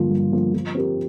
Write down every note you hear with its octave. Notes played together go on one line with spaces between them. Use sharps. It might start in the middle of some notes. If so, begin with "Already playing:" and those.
Already playing: G2 D3 F3 A#3 F4
G2
D3 F3 A#3 F4
F3
C4 G4 A#4